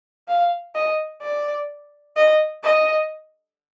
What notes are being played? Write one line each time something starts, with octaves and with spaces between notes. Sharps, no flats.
F5
D#5
D5
D#5
D#5